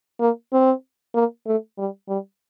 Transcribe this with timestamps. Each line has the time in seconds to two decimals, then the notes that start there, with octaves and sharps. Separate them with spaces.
0.20 A#3
0.53 C4
1.15 A#3
1.46 A3
1.78 G3
2.08 G3